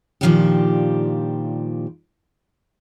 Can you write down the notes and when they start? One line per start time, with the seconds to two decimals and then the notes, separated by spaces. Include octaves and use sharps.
0.21 A#2 D#3 F3 G3 D4 G4